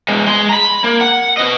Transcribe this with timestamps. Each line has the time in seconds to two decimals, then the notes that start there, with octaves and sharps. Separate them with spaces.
0.08 G#3 B3
0.28 G#3 C6
0.49 A#5 B5
0.84 A#3
1.01 F#5
1.37 B4 D#5